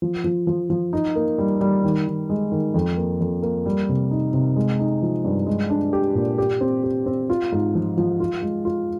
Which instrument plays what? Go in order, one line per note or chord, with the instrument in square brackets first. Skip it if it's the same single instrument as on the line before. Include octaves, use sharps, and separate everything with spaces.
[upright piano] F3
F3
F3
F3
D#4
A#3
G3
G3
D#3
D#3
G#3
D#3
F2
A#3
F2
A#3
G3
C3
D#4
C3
G#3
D#4
F3
G2
G#3
D4
G4
A#2
G4
C4
G4
C4
F4
G#2
F3
F3
F4
G#3
F4